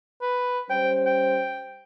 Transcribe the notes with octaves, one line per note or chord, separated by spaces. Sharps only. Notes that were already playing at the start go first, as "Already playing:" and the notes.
B4
G3 C#4 C5 G5
G5